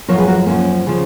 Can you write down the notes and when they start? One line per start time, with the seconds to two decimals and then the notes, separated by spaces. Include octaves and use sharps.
0.08 F#2 F3 A#4 C#5
0.18 G#4 B4
0.28 F#4 A#4
0.46 F#2 F3 A#3 C#4
0.86 C#3 F3